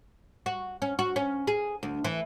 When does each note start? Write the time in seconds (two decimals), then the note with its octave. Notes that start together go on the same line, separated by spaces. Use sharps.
0.46 F#4
0.82 C#4
0.99 F#4
1.16 C#4
1.47 G#4
1.83 D2
2.04 E3